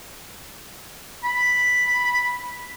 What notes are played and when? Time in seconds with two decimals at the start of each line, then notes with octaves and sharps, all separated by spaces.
1.24 B5